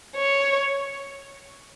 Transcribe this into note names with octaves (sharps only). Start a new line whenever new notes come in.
C#5